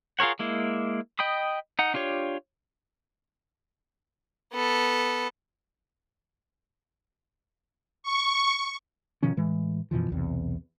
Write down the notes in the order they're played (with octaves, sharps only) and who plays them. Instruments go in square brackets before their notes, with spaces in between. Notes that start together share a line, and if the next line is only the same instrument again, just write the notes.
[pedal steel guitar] F4 G#4 A#4 C#5 F#5
G#3 A#3 E4
D#5 G5 B5 D#6
D#4 F#5
D4 F4 G4 C#5
[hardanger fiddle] B3 A4
[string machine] C#6
[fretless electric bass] B2 D#3 F3 C#4
A2 E3 G#3
F#2 B2 E3 F3
B1 E2 C3